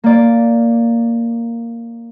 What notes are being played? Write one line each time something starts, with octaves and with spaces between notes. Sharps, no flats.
A#3 D5